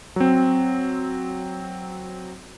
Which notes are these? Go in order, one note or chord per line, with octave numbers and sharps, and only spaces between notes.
F#3 C4